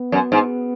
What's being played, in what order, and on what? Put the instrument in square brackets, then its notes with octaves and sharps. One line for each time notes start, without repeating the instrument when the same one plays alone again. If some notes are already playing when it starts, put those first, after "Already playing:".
Already playing: [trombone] B3
[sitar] F#2
G#2